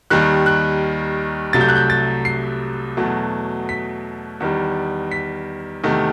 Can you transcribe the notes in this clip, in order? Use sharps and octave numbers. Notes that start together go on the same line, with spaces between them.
D#2 D#3 G3 F#6
F#6
C2 C3 F#3 A3 A6
G6
F#6
G6
A6
C7
E2 B2 F#3 A3
B6
E2 D#3 G3
B6
E2 C3 D#3 A3